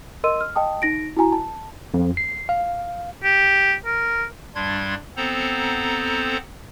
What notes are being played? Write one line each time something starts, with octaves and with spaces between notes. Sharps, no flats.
A#4 D#5 C6 E6 D#7
F6
D#5 G5 A5 D#6
D#4 A#6 D7
E4 F#4 G#5 A#5
A5
F2
C7
F5
G4
A#4
G2 G3 D4 C6 G#6
B3 C4 A4 C5 A#5